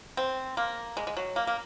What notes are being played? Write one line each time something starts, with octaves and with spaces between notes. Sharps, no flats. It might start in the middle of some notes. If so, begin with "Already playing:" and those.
C4
A#3
G#3
G#3
F#3
A#3
A#3